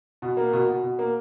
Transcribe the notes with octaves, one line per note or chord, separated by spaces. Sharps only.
B2
A#3
B2
B2
B2
A#3